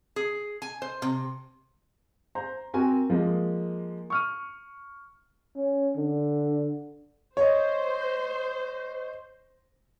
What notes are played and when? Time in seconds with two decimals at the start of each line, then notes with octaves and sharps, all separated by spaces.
0.16 G#4
0.62 G#5
0.82 C5
1.02 C3
2.35 C5 A#5
2.74 C4 F#4 A#4 G#5
3.10 F3 G#3 A#3
4.10 C#6 F6 D#7
5.56 C#4
5.97 D3
7.37 C5 C#5 D#5